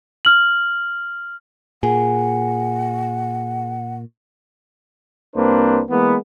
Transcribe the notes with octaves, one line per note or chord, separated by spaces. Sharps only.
F6 F#7
A#2 G#4 F#5
C2 A#3 C4 D4 B4 C5
E3 G#3 A#3 B3